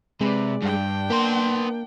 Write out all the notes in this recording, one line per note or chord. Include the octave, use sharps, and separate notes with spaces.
C3 G#3 B4 D5
G2 D4 G5
A#3 B3 C6